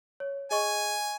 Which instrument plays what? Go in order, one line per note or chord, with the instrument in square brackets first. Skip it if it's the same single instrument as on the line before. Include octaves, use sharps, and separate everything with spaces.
[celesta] C#5
[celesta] G#4 D#5 C#6 [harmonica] G#5